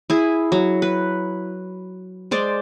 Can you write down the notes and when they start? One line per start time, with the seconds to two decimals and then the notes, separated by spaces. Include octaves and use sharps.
0.10 E4 G#4
0.52 F#3
0.82 B4
2.31 G#3 C5 D5